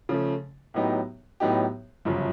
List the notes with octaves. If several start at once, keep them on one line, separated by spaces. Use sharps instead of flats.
C#3 F3 A3
A2 F#3 B3 D#4 G4
A2 F#3 B3 D#4 G4
G1 F#2 C#3 F3